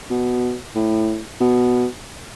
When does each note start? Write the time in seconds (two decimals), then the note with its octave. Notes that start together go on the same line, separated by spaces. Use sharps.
0.10 B2
0.75 A2
1.41 B2